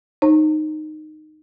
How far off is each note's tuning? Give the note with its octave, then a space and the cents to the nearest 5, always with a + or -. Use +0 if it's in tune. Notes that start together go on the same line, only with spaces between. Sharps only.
D#4 -15 C5 +40 A#5 -40